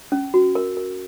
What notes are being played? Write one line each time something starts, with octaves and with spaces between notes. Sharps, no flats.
C#4
F#4
A#4
A#4